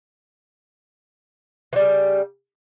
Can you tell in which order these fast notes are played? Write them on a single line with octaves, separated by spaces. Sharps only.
E3 G3 C#3